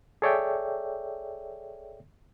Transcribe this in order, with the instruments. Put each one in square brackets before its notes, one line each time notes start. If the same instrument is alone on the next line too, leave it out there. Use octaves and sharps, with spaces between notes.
[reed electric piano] G#4 A4 C#5 D5 E5 G5